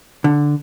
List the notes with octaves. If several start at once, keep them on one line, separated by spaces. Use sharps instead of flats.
D3